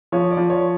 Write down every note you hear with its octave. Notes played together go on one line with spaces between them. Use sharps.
F3 C#5
D5
F3
C#5